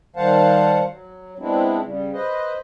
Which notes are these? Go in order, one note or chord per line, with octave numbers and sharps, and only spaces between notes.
D#3 G3 C5 F5 F#5 A5
F#3
G#3 B3 C4 D4 E4
C#3 G3
B4 C5 D#5